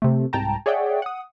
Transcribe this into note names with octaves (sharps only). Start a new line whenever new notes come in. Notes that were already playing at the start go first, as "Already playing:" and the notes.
C3 A3
C2 G#2 G5 A5 A#5
G#4 C#5 D5 E5 F#5 G5
F#5 D#6